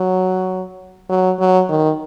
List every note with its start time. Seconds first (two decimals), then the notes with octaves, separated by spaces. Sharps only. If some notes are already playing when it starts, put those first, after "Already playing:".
Already playing: F#3
1.10 F#3
1.39 F#3
1.69 D#3